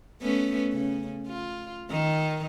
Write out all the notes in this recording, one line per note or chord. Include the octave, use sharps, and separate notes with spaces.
A3 B3 C#4
C#3
F4
D#3